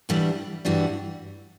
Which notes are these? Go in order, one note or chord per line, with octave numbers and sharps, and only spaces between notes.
G2 E3 G3 D4 F#4
G2 E3 G3 D4 F#4